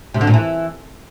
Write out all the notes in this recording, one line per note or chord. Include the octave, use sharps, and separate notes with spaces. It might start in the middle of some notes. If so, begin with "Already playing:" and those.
C3
D3
A#2
E3